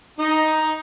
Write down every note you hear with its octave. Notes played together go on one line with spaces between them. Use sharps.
D#4